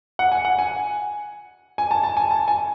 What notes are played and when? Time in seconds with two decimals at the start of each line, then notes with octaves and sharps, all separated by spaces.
0.19 F#5
0.32 G#5
0.45 F#5
0.59 G#5
1.78 G#5
1.91 A5
2.03 A5
2.17 G#5
2.31 A5
2.48 G#5